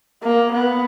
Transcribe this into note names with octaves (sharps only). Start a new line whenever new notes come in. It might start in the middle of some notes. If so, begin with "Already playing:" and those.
A#3
B3